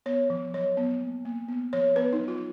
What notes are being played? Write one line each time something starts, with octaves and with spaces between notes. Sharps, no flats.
B3 C#5
F3
F#3 C#5
B3
A#3
A#3
B3
F3 C#5
B3 B4
D#4
F#3
F4